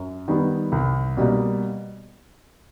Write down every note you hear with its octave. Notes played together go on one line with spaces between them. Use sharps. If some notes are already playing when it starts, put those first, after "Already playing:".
Already playing: F#2
D#3 G3 B3
C2
B2 G3 A#3